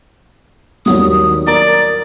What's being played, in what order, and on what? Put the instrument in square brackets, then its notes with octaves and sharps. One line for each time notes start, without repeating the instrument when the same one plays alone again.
[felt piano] D#2 F#3 G3 [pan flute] D#6
[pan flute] A#4 [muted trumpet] D5 [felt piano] A#5